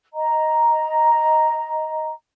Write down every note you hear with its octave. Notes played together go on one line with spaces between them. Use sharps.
D#5 A#5